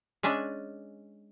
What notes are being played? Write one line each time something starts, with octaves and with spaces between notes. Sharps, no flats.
G#3 C#4 D4 E5